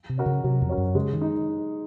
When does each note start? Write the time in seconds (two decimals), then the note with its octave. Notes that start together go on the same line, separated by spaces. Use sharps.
0.09 C3
0.18 C#4 F#4 A#4
0.26 C#3
0.44 C3 F#3
0.61 F2
0.69 C#4 F#4 A#4
0.78 F#2
0.95 C#3 G#3
1.13 D#3
1.21 D#4